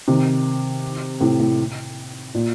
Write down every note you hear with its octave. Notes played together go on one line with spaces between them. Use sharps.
C3 D#3
A2 C3
A2
A#2